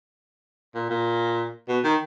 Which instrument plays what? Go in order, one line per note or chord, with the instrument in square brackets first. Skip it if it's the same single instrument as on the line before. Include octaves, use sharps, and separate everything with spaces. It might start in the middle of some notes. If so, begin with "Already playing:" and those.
[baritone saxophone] A#2
A#2
B2
D#3